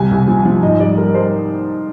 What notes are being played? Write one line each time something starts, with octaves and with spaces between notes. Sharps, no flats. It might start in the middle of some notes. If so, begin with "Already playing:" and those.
Already playing: C2 G3 G#5
C2
F3
F3
G#2 D#5
G3 D5
G3 A#4
G3 C5